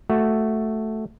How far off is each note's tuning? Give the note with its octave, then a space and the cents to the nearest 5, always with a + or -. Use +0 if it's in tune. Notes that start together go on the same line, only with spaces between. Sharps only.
A3 +0 F#4 +0